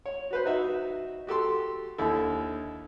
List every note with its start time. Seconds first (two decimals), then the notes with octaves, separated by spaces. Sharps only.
0.06 C#5
0.31 F#4 B4 C5
0.45 D#4 F#4 E5
1.27 F#4 G4 A4 C6
1.98 D#2 D3 E4 A4